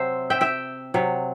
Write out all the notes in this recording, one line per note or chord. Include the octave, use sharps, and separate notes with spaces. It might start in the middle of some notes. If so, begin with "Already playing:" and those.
Already playing: C3 F#3 C5 E5
E5 G5
E5 G5
C3 F#3